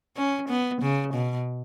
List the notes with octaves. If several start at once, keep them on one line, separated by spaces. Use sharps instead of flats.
C#4
B3
C#3
B2